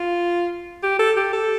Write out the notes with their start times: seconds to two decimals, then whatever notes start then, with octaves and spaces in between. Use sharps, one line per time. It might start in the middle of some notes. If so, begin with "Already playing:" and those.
Already playing: F4
0.83 G4
0.99 A4
1.17 G4
1.33 A4